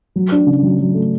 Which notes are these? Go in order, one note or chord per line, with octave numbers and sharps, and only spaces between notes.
F#3
D4
C#3
F#3
F#3
A3